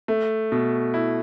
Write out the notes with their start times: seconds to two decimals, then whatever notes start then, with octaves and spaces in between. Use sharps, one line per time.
0.08 A3
0.52 B2
0.94 E4